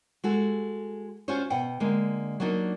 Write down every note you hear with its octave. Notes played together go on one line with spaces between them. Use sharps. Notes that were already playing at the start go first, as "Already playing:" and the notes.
G#3 F#4 A4
C#4 F4 F#4 C5 C#5
B2 F#5 G5
D3 G#3 A#3
F#3 A#3 D4 D#4 F#4